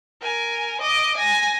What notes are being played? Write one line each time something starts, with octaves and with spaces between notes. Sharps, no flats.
A#4 G#5
D#5 D6
G#5 A#6